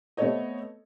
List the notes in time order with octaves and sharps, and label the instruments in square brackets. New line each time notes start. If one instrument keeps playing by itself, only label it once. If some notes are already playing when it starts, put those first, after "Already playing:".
[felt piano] A3 B3 C4 A4 C#5 D#5